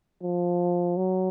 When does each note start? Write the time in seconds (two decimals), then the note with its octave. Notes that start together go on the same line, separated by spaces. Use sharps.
0.23 F3
0.97 F#3